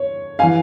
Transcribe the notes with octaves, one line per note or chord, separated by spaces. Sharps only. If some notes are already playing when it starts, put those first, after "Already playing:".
Already playing: C#5
E3 F5 G#5